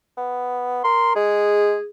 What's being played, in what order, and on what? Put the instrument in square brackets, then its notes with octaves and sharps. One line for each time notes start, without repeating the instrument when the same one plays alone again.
[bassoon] B3
[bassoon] A#4 [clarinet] C6
[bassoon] G#3 [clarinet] G#4